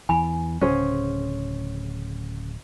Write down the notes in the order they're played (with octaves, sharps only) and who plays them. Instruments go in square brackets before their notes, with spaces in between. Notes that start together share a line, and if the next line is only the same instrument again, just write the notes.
[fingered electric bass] E2 E3 [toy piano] G#5 B5
[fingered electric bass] D1 C#3 [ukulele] C#4 G#4 C5